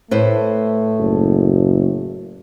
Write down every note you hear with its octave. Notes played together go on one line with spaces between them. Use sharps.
A2 A3 B4 C5
F#1